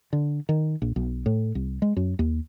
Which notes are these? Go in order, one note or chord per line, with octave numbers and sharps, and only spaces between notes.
D3
D#3
A#1
B1
A2
C2
G#3
F#2
D#2